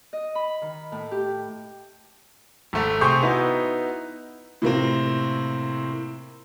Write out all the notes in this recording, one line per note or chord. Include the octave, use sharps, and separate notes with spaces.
D#5
B5
D#3
A2
G4
G#1 A3 F7
C3 G#4 C6 C#6 G6 F7
B3 D#4 E4 F#4 B4
A2 C3 A#3 C4